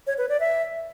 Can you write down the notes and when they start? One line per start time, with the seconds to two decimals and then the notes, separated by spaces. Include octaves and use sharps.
0.07 C#5
0.18 B4
0.29 D5
0.40 E5